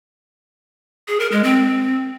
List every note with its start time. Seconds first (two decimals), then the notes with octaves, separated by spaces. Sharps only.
1.08 G#4
1.20 A#4
1.32 G#3
1.44 C4